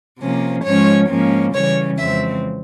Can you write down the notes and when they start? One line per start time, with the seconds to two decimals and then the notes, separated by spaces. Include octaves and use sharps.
0.19 C3 F3 A#3 C#4
0.64 G#2 F3 G#3 C#4 C#5
1.09 G#2 F3 A#3 C#4
1.54 C#3 E3 G3 C#4 C#5
1.98 F2 C#3 E3 G#3 C4 E5